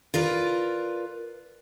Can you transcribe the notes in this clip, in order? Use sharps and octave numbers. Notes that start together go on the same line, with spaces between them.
F4 A#4 B4 D5